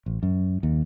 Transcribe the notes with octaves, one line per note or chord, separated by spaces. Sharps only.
A1
F#2
D#2